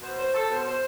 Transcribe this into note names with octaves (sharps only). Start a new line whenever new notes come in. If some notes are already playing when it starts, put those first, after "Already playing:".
B2 C5
C5
A4
B2 C5
C5